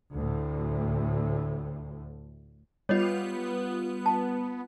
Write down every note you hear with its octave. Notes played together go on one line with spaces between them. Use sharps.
D2 A2
G3 B3 F4 C#5 D#5
A5